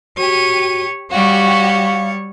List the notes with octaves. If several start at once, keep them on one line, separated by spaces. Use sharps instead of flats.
F#4 G4 C#5 D#7
G3 F#4 G4 C#5 F5